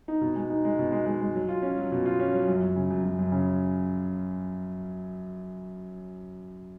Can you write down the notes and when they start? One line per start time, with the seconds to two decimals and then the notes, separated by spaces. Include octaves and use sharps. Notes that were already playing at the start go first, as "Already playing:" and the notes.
0.08 D#4
0.21 B2
0.36 G#3
0.50 D#4
0.65 G#3
0.79 B2
0.92 G#3
1.06 G#3
1.21 G#3
1.35 F#3
1.49 F4
1.62 C#4
1.78 F#3
1.92 B2
2.06 F4
2.20 C#4
2.33 F#3
2.48 F#2
2.62 F#2
2.76 C#3
2.91 F#2
3.04 F#2
3.19 F#2
3.32 C#3